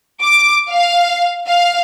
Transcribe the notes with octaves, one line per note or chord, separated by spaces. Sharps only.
D6
F5
F5